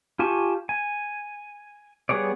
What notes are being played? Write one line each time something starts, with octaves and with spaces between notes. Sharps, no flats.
F4 G4 G#5 A5 C#6
G#5
G3 B3 G#4 C#5 D5